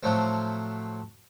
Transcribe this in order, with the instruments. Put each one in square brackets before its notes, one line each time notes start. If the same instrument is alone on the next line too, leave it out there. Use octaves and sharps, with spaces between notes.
[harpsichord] A2 F3 F#3 A3 C4